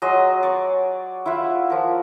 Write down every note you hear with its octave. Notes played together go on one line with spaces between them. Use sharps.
F#3 G#4 D#5 C6
C#5 D5
E4 F4 E5 F#5
F3 A#4